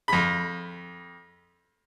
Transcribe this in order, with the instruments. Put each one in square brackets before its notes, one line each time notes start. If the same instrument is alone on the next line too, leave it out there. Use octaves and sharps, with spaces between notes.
[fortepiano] F2 B5